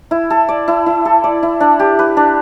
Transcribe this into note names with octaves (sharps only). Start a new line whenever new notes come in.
E4
A4
D5
E4
E4
A4
D5
E4
D4
G4
B4
D4